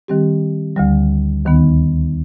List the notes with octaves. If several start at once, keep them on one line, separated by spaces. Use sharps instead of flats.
D#3 G3 C4 G4
D2 D3 G3
D#2 D#3 B3 D#4